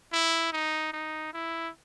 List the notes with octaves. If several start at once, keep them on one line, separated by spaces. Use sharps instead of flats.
E4
D#4
D#4
E4